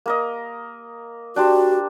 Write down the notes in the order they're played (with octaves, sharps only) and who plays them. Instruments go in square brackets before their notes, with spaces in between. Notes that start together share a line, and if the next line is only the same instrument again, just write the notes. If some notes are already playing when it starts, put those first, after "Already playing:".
[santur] A#3 A#4 D#5
[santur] D4 G4 C5 [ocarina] F#4